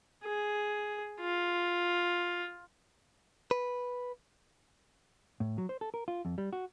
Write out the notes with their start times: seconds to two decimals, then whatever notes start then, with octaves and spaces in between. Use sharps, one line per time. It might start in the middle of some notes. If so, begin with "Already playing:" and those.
0.24 G#4
1.20 F4
3.51 B4
5.40 A2
5.58 F#3
5.69 C5
5.81 A4
5.94 A#4
6.08 F4
6.25 F2
6.38 G3
6.53 F#4